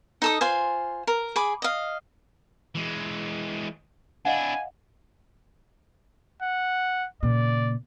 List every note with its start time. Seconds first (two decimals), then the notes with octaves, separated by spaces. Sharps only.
0.22 D#4 A4 D#6
0.41 F4 C5 G#5
1.07 A#4
1.36 G#4 G#5 B5 D6
1.62 D#5 F5
2.75 E3 G#3
4.25 D4 E4 D#5 F5 F#5 G#5
6.42 F#5
7.23 A#2 C#3 D5